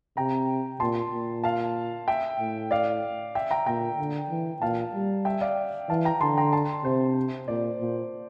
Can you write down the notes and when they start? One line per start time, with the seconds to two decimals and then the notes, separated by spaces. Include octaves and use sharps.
0.17 C3 G5 A#5
0.80 A#2 A5 C6
1.12 A#2
1.44 F5 A5
2.08 E5 G5
2.39 A2
2.71 D5 F5
3.35 E5 G5
3.51 G5 A#5
3.67 A#2 G5 A#5
3.98 D3
4.30 E3
4.62 A#2 F5 A5
4.94 G3
5.25 E5 G5
5.41 D5 F5
5.89 E3 F5 A5
6.05 G5 A#5
6.21 D3 A5 C6
6.38 G5 A#5
6.52 A5 C6
6.84 C3 C5
7.48 A#2 D5
7.81 A#2